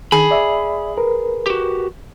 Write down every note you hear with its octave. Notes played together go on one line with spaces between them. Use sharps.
D#3 G#4 B5
D5 E5
A#4 B4
F#4 G4